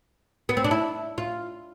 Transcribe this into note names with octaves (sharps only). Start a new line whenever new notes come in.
B3
C4
D4
E4
F4